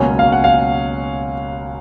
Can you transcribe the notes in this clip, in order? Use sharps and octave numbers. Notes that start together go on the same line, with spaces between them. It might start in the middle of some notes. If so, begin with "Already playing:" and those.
Already playing: C#2 B2 F#3 A#3 C#4 G#5
F5
F#5
F5